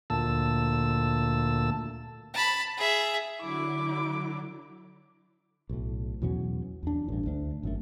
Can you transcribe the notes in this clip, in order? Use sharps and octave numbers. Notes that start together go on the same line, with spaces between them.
D2 A#2 A5 E6
A5 B5
G#4 E5
D3 F#3 E4 D6
B1 A2
E2 B2 F#3 C#4
E2 D4
A1 G2
D2 D4
G#1 F#2 A3